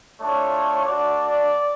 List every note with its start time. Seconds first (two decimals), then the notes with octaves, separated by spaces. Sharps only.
0.20 A3 D4 F4 C#5
0.85 A3 D4 F#4 D5